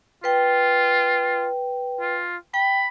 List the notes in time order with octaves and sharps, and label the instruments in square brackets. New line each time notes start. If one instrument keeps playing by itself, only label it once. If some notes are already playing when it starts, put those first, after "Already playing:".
[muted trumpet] F4 [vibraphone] B4 G5
[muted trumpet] F4
[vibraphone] G5 [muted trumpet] B5